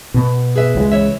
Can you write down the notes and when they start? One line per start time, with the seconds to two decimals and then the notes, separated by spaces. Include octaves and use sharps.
0.14 B2 B3
0.56 G#4 B4 E5
0.75 C#2 F3 G#3
0.92 E3 C#5 E5